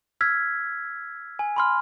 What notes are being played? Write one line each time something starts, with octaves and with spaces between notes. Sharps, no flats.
E6 F6 G#6 B6
G#5
B5 C6 F6